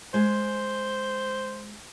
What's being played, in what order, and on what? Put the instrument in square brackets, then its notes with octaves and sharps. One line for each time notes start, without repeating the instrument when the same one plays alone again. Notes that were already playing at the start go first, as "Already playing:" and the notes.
[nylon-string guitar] G#3 G#5 [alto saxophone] C5